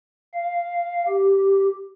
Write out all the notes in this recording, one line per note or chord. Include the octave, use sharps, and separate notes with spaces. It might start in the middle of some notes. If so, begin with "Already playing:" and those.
F5
G4